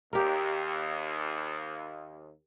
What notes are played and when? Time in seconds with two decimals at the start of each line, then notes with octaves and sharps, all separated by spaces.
0.13 D#2 G4 A#4